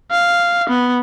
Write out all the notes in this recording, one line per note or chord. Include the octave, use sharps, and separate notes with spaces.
F5
B3